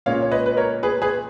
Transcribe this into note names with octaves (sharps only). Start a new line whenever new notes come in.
A#2 G#3 C#4 C#5 F5
C#5
B4 D#5
B4
A#4 C#5
G#4 B4
G#4 B4